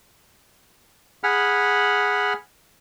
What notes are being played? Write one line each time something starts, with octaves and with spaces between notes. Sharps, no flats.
G#4 F#5 B5 F6